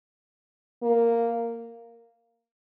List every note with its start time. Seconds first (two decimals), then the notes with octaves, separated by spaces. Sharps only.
0.83 A#3